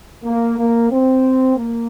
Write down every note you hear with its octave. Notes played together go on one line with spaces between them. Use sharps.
A#3
A#3
C4
A#3